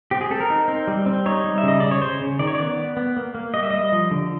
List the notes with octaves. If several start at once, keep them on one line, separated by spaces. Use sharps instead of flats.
C4 G4
G#4
C4 A4
A#4
D#4
C4
G3
C4
D#4 C#5
G3
E5
C#3 D#5
C#3 D5
C#5
C#3 C5
C#3
D#3 D5
C#5
B3 D5
B3
B3
A#3
A#3
G3 D#5
E5
G3 D#5
F3
D3